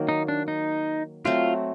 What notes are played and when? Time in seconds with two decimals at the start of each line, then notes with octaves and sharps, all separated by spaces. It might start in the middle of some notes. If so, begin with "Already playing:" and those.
Already playing: D#3 F#3 A#3
0.09 D#4
0.28 D4
0.48 D#4
1.25 F#3 A3 C4 F4